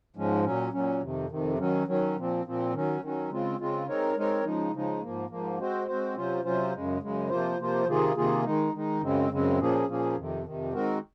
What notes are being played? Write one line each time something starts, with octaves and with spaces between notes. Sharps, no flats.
G#2 F3 G#3 C#4
A#2 F#3 C#4
A#2 F#3 C#4
F2 C3 D#3
F2 C3 D#3
D#3 F#3 C#4
D#3 F#3 C#4
A#2 F3 C4
A#2 F3 C4
D#3 F#3 C#4
D#3 F#3 C#4
C#3 G#3 C4 F4
C#3 G#3 C4 F4
G#3 C4 D#4 A#4 C#5
G#3 C4 D#4 A#4 C#5
C#3 F3 G#3 D#4
C#3 F3 G#3 D#4
G#2 F3 A#3
G#2 F3 A#3
G#3 C4 F#4 C5
G#3 C4 F#4 C5
C3 F#3 C#4 F4 C5
C3 F#3 C#4 F4 C5
F#2 C#3 G#3
F#2 C#3 G#3
C3 F3 A#3 F4 C5
C3 F3 A#3 F4 C5
C3 D#3 A#3 F4 G#4
C3 D#3 A#3 F4 G#4
D#3 G#3 D#4
D#3 G#3 D#4
F#2 C#3 G#3 C4
F#2 C#3 G#3 C4
A#2 F3 A#3 C#4 G#4
A#2 F3 A#3 C#4 G#4
F2 C3 D#3
F2 C3 D#3
D#3 G#3 C4 F#4 A#4